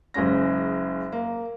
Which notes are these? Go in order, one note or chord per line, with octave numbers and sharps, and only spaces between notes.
F#1 C#3 G#3 C#4 A#6
A#3